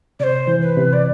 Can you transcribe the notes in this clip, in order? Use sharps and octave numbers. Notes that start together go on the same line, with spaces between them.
C3 C5 D5
E3
B4
C3
D5